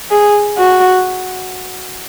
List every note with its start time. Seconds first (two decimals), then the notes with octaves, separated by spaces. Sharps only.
0.11 G#4
0.58 F#4